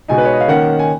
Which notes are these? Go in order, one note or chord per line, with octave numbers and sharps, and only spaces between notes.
B2 G#3 D#4 G#5
B4
C#5
D#5
F5
D#3 A#3 C#4 F#5
G#5